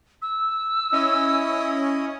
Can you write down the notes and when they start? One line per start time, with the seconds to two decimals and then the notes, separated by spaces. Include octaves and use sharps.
0.22 E6
0.92 C#4 E4 D#5